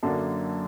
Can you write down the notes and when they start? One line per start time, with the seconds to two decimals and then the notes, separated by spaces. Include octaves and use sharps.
0.03 F#2 D3 F#3 A#3 D4 A5